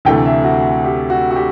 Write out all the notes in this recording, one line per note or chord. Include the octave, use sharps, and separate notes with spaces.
D2 C3 E3 A3 G5
E5
F#4
G4
F#4
F#4
G4